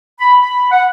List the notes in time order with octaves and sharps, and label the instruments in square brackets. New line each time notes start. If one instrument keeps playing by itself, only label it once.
[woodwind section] B5
B5
F#5